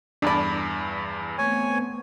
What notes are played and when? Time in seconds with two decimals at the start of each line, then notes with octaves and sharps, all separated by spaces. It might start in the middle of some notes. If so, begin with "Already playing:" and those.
0.22 E2 G2 D4 D5 B5
0.67 E3
1.38 A3 B3 C4 C#5 G#5